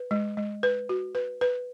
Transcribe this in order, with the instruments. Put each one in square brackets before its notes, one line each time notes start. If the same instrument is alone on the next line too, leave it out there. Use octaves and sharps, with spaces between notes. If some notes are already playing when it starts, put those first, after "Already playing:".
Already playing: [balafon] B4
G#3
G#3
B4
F#4
B4
B4